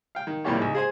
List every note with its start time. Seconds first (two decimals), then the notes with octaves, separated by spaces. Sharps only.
0.15 F5 G5
0.27 D#3
0.44 F2 A2 G3 A#3 G4 C#5
0.57 C#2 G#2
0.75 G#4 C5 G#5